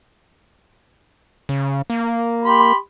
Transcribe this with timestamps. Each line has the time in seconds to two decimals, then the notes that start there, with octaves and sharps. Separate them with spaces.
1.49 C#3
1.90 A#3
2.44 G4 B5 C6